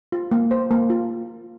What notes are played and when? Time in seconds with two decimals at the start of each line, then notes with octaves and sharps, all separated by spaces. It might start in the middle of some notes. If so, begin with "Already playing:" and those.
0.12 F4
0.31 A#3
0.51 C5
0.71 A#3
0.90 F4